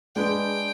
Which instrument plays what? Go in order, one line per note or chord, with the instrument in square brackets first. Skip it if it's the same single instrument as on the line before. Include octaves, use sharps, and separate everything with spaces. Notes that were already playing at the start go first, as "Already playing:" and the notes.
[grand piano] G#3 D4 G#4 B4 [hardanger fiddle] G5